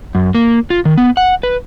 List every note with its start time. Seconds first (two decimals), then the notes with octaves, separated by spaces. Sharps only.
0.15 F#2
0.35 A#3
0.70 F4
0.85 D#3
0.98 B3
1.17 F#5
1.43 B4